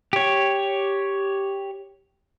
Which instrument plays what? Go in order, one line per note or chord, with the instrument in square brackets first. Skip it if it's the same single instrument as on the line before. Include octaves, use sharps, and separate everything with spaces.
[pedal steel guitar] G4 C#5